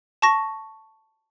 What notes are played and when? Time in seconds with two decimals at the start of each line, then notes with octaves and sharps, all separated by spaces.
0.22 A5 C#6 A#6